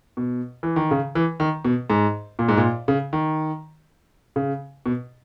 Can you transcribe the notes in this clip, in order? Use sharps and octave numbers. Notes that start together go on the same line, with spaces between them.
B2
E3
D#3
C#3
E3
D#3
B2
G#2
A#2
G#2
A#2
C#3
D#3
C#3
B2